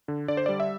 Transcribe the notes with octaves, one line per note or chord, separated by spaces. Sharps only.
D3
D3 D5
C5
G3 D5
E5